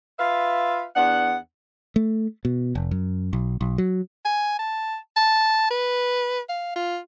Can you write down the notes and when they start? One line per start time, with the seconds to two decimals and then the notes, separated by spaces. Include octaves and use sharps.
0.19 F4 B4 E5 F5
0.96 E2 B3 D4 F#5
1.96 A3
2.45 B2
2.75 F1
2.91 F#2
3.33 B1
3.61 B1
3.78 F#3
4.25 G#5
4.59 A5
5.16 A5
5.71 B4
6.49 F5
6.76 F4